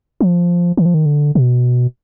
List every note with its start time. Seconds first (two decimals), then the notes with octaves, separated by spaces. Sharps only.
0.21 F3
0.77 D#3
0.86 F3
0.94 D#3
1.06 D3
1.35 B2